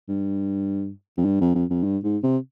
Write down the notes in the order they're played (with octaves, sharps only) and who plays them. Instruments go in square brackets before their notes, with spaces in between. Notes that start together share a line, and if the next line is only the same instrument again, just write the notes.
[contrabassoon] G2
F2
G2
F2
F2
F2
G2
G#2
C3